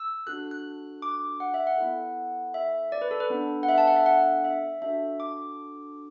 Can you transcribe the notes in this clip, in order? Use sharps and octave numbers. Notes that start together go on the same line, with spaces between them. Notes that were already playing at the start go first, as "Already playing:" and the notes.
Already playing: E6
D4 F#4 A4 F#6
F#6
D6
F#5
E5
F#5
B3 E4 A4
E5
D5
B4
A4
B4
B3 D4 A4
F#5
E5
A5
F#5
E5
F#5
E5
D4 F#4 A4 E5
D6